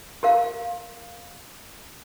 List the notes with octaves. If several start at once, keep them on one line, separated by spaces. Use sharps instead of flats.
G4 A#4 F5